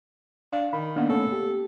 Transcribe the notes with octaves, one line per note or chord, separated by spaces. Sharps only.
D4 F5
D#3 B5
A#3 B3 D4
A3 C#4 A4
G4